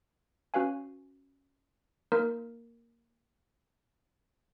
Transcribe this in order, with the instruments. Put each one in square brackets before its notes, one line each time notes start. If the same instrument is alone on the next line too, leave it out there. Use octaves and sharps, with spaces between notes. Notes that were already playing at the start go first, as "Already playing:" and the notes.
[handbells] C#4 F#4 B4 F5 G#5
A#3 D#4 A#4